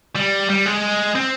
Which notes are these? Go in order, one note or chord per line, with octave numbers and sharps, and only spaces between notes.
G3
G3
G#3
C4